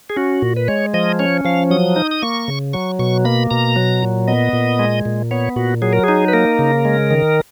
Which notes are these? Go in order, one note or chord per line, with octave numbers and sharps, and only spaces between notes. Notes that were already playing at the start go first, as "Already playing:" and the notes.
G#4
C#4 F#4
A#2
B4
G#3 C#5
F3 D#5
C#4 C#5
F3 F5
F#3 D#6
D#4
D#6
A#3 C#6
C#3
F#3 C#6
B2 C#6
A#3 B5
B2 A#5
F#3
A#2
B3 D#5
A#2
G#3
A#2
B3 C#5
A#2 F#4
F#3 G#4
A#4
D#4 G#4
B4
A#3 A#4
C#3
G#3
D#3